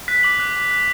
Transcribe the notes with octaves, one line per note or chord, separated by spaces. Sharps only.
F#6 B6
D6 F#7
F#6
D6
F#6